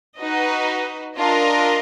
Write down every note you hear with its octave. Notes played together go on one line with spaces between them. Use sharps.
D#4 F#4 B4 D#5
D4 F4 A#4 D#5